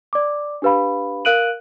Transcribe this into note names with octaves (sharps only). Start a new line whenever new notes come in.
D5 D6
D4 G4 B4 F5 B5
A#4 F5 F#6 D7 D#7 F#7